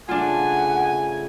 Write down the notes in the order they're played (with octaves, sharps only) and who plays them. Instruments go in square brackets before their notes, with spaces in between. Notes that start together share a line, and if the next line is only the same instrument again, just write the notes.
[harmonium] C#3 A3 [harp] D4 F4 [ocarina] F#5 [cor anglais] G#5